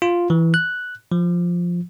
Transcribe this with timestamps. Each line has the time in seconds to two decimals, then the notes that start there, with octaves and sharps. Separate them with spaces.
0.02 F4
0.30 E3
0.54 F#6
1.12 F3